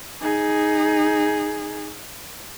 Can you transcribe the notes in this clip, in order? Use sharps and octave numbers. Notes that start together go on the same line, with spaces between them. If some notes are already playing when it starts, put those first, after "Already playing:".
D#4 G#4